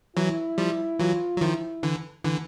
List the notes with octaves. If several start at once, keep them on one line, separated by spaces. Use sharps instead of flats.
E3 F#3 E4
F3 G3
E3 F#3 F4
F#3
D#3 F3 E4
D3 E3
D3 E3